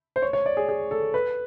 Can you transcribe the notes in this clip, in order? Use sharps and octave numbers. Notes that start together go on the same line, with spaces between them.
C5
C#5
C#5
D5
G#4
G#4
A4
B4